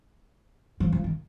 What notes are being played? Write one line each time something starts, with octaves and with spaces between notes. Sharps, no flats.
F3
F3
D#3